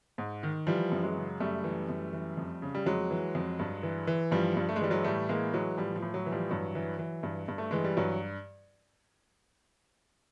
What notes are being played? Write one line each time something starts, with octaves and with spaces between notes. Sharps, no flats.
G#2
D#3
E3 F3 G3
F#2
F#3 G#3
C#3
F#2 G3 A3
E3
F#2
E3
F2
C#3
G3
F2 F#3 G#3
E3
F2
G2
E3
E3
G2 F3 G3
G2
A3
G#3
E3 G3
F#3 G#3
A2 G3 A3
E3 G#3 A#3
E3 F#3 G#3
A2 F3 G3
F3
A2
F#3
E3
F3 G3
G2 F#3
E3
E3
G2
G2
A3
E3 G#3
G3
G2 F#3